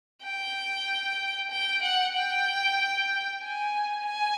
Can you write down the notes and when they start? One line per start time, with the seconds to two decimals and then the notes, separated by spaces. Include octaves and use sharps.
0.24 G5
1.50 G5
1.82 F#5
2.15 G5
3.43 G#5
4.07 G#5